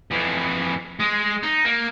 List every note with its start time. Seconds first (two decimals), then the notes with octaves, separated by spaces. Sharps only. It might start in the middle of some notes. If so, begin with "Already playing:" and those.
0.11 F2 E3
1.00 G#3
1.43 D#4
1.65 A#3